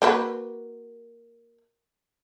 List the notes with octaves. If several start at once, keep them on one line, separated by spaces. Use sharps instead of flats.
A#3 F#4 B4